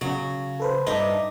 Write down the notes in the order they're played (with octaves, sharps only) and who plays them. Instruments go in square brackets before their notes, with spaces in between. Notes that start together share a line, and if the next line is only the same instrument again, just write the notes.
[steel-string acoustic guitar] C#3 [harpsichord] F#3
[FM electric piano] A4 B4 C5
[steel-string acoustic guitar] G2 E5 [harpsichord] D#4 [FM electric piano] A4 D6